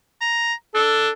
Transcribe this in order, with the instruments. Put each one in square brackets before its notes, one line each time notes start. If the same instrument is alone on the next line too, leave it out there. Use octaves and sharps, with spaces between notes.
[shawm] A#5
[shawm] D4 [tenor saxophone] A4